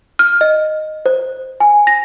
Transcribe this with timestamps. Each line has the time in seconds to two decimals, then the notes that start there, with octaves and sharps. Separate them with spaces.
0.19 F6
0.41 D#5
1.06 C5
1.60 G#5
1.87 A#6